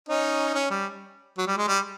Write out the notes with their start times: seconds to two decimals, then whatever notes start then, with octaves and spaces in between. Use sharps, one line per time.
0.09 C#4 D#4
0.54 C#4
0.70 G3
1.38 F#3
1.47 G3
1.57 G#3
1.67 G3